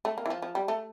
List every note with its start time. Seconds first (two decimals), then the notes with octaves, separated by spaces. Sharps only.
0.05 A3
0.18 A#3
0.26 E3
0.30 F3
0.42 F3
0.55 G3
0.68 A3